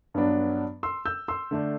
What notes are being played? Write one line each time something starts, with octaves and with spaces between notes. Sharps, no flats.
G2 F#3 B3 D4
C6 E6
E6 G6
C6 E6
D3 A3 D4